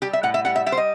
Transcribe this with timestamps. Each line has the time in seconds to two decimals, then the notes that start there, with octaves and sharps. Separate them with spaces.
0.02 G3 G4
0.13 E5
0.23 A2 F#5
0.34 E5
0.45 G3 F#5
0.56 E5
0.66 G3 E5
0.72 C5
0.77 D#5